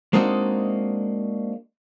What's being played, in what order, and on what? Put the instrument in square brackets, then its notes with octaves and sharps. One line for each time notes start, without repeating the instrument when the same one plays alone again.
[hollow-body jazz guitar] G#3 A#3 C4 D4 D#4 F#4